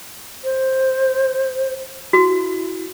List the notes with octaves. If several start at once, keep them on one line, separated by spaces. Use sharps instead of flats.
C5
E4 F#4